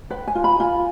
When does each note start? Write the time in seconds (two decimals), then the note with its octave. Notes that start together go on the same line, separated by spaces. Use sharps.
0.10 B4 G5
0.27 G#5
0.35 F4
0.44 B5
0.60 F4 G#5